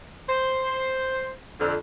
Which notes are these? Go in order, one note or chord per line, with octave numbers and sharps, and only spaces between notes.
C5
F2 D3